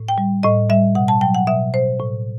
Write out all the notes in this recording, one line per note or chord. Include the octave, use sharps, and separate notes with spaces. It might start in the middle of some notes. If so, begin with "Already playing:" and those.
Already playing: A2
G5
G3
A2 D#5
G3 E5
B2 F#5
A5
F#3 G5
F#5
B2 E5
B2 C5
A2